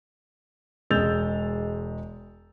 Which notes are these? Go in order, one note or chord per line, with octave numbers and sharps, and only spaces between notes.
E1 G#3 E6 G6 A6 F7